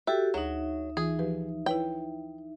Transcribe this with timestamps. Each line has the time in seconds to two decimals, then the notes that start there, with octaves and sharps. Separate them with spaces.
0.07 F#4 G4 A4 E5 G5
0.34 D2 F#3 D#4 G#4 E5
0.97 E3 F4 G#4 D#6
1.19 F3 G4 B4
1.66 E4 B4 C#5 G5